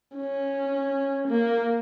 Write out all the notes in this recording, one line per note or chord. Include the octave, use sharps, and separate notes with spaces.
C#4
A#3